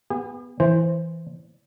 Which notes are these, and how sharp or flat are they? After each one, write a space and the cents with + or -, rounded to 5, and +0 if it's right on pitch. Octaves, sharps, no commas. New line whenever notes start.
B3 -5 G#4 -45
E3 +0 C5 +0